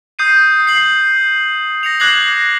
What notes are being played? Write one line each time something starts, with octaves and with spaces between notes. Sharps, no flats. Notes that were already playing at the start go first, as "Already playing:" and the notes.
D#6 G6 C7 D#7
C7 F#7
A#6 C#7 F7
D6 F#6 G#6 A#6 C7 F#7